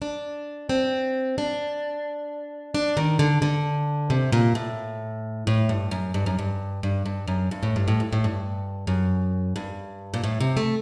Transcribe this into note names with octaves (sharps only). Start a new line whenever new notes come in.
D4
C4
D4
D4
D#3
D3
D3
C3
A#2
A2
A2
G2
F#2
G2
F#2
G2
G2
G2
F#2
G2
A2
G2
A2
G2
A2
G2
F#2
G2
A#2
A2
C3
A3